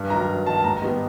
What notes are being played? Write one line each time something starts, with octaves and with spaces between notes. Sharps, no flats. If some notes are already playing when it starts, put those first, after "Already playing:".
Already playing: G2
D#3 F#3 A#5
G2
D#3 F#3 A5
A5
G#2 A#5
D#3 G3 B3